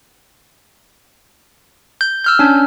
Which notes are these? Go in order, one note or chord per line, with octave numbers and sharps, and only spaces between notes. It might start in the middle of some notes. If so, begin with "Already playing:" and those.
G6
E6 F6 G6
C#4 D4